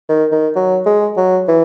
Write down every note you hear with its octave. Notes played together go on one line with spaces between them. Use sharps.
D#3
D#3
F#3
G#3
F#3
E3